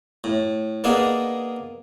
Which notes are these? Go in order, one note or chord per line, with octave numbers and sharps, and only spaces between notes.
A2
A#3 B3 D4 D#4 G#4